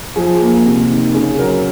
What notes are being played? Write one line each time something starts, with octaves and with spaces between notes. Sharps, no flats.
F3 G#4
A#3
C3
D#3
C#3 G#4
F#3 A#4